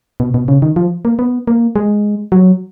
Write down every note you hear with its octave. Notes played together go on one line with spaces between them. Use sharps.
B2
B2
C#3
D#3
F3
A#3
B3
A#3
G#3
F#3